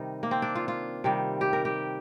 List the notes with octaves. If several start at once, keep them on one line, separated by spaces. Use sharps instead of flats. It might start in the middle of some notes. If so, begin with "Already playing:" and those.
Already playing: C3 D#3 G3 D#4
A#3
C4
D4
F4
F4
C3 D#3 G3
G4
A#4
G4